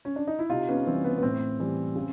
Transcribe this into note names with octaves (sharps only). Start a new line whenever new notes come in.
C#4
D4
D#4
E4
C3 D#4 F4
B3 C#4
E3 G3 C4
B3
B3
A2 C4
E3 G3
C#3